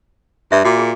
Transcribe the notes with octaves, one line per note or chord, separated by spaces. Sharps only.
G2 E5
A#2 F#4 D6
G#4